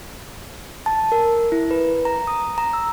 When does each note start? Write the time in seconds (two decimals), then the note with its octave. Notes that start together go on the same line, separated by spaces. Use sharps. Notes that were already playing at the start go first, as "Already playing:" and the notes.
0.86 A5
1.12 A#4
1.52 E4
1.71 B4
2.05 A#5
2.27 D#6
2.58 A#5
2.73 E6